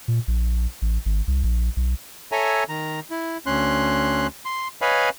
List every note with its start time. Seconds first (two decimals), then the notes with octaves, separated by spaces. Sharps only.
0.08 A#2
0.28 A#1
0.82 A1
1.06 G#1
1.27 C2
1.44 A#1
1.77 B1
2.32 A4 C#5 E5 G#5 A#5
2.69 D#3 A#5
3.10 E4
3.46 D2 C#4 C6 F#6
4.45 C6
4.82 B4 C#5 D#5 F5 G#5 B5